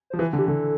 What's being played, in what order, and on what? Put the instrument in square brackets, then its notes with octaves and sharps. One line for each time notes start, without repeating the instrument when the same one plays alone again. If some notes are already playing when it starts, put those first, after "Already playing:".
[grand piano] F3 [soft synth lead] C5
[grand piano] E3 [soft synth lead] B4
[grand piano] D3
[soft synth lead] G4
[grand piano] D3 [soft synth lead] A4